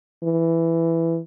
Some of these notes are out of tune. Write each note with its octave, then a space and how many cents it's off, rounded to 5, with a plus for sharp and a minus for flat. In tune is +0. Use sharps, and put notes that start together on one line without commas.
E3 +5